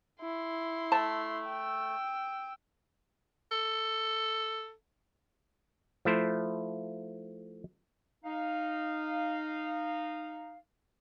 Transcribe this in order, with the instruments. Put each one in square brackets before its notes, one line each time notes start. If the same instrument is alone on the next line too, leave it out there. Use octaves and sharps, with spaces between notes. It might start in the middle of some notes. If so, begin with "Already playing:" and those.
[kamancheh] E4 C6
[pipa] A3 A5
[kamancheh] G5 E6
[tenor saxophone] A4
[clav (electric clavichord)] F3 A3 E4 C5
[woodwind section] D#4 F5